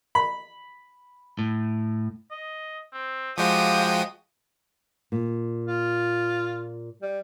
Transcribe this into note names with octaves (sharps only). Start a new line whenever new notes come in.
B5
A2
D#5
C4
F3 G#3 F#4 G4 F5 G5 D#6
A#2
F4
G3